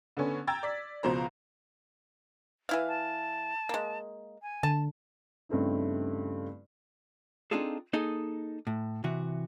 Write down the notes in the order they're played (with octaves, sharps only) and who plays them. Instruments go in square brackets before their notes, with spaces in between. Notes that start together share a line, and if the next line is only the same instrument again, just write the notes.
[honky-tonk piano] D3 B3 C#4
G5 A#5 E6 G#6 A6
D5 B6
C#2 B2 F3 C5 A#5
[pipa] E3 E4 F5
[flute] A5
[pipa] G#3 A#3
[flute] G#5
[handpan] D3 [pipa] A5
[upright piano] G2 C#3 A3 C4 D#4 E4
[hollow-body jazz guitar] C4 D4 D#4 F4 G#4 A4
A#3 D#4 G#4 A4 D#5
A2
C3 E3 F#4